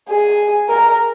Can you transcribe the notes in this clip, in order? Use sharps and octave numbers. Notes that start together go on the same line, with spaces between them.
G#4
A#4